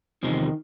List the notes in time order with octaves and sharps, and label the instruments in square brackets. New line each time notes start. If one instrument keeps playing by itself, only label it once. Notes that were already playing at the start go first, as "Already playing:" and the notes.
[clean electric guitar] E2 C3 F3 G#3 [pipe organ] D#3